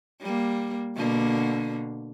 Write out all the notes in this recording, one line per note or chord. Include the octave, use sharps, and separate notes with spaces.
G3 A#3
B2 D3 A#3